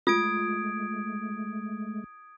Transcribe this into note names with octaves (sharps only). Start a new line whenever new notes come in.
G#3 A3 F4 D#6 G#6 D7